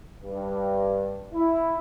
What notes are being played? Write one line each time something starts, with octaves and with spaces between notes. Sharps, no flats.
G2
E4